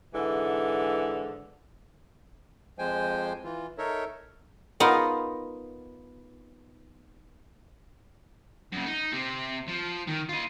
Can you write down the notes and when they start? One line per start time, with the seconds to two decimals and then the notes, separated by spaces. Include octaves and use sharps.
0.13 G#2 D3 E3
2.79 F2 F3 G#3 C5 G5 G#5
3.44 E3 F4
3.78 D#4 A4 A#4 C#5 E5
4.80 B3 D#4 F4 A#4
8.72 F#2 C#3
8.86 D#4
9.12 C3 C4
9.68 F3
10.07 D#3
10.29 F4 D#5